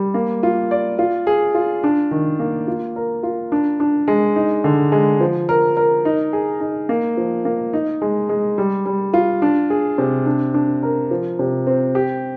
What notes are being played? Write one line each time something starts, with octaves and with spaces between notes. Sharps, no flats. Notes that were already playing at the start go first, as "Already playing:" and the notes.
Already playing: G3
A#3
F4
D5
F4
G#4
F4
D4
D#3
A#3
F4
A#4
F4
D4
D4
G#3
D#4
D3
G#3
F3
A#4
A#4
D#4
G#4
D#4
A#3
F3
A#3
D#4
G#3
G#3
G3
G3
F4
D4
G#4
C3
D4
D4
A#4
F3
C3
C4
G4